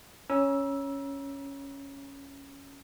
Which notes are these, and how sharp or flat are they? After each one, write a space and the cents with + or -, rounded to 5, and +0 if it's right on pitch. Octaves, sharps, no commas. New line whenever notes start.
C#4 +0 A#5 +40 E6 +0